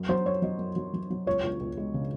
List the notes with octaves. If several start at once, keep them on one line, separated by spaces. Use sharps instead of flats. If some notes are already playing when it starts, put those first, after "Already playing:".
Already playing: F#2
F#3 C5
F#2 C#5
F#3 D#5
F#2
F#3
F#3
F#3
C#2 C#5
C#2
C#2
G#3
C#3